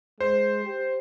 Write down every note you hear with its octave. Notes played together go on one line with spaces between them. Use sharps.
G#3 C5
G4